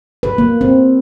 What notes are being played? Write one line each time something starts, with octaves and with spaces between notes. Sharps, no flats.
B4
A#3
C4